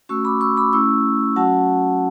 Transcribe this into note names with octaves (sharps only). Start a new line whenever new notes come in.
A3 C#4 F#4 C#6 E6
B5 D6
C#6 E6
B5 D6
A3 C#4 E4 C#6 E6
F#3 C#4 F#4 F#5 A5